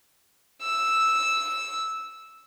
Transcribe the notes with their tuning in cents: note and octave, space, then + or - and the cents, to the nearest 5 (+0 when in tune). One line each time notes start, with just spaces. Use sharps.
E6 -5